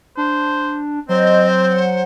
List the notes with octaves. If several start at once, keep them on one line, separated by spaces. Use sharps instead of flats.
D4 C5
F#3 C4 C5 D#5
F#5